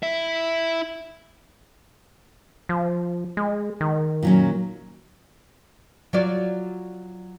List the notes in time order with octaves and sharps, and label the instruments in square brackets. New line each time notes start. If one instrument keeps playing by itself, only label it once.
[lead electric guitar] E4 E5
[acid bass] F3
G#3
D#3
[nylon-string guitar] A#2 F#3 C#4
[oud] F#3 F4 D5